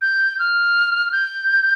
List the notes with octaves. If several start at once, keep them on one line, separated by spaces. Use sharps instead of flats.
G6
F6
G6